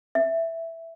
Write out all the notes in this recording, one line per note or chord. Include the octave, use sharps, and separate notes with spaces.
E5